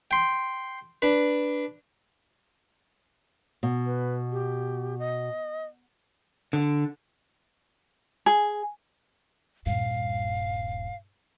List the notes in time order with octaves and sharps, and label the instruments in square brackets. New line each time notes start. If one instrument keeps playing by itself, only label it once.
[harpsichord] G5 C6
D4 B4
[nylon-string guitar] B2
[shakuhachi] B4
G4
D#5
[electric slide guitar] D3
[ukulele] G#4 [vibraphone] G#5
[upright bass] D#1 G2 [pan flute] F5